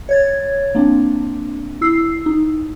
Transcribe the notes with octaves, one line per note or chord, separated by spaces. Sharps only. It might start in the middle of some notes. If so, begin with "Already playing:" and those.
C#5 G#6 A6
A#3 C4 D4
E4 E6 C7
D#4